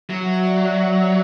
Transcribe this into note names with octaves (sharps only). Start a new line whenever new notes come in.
F#3 E5
F#5
E5
D5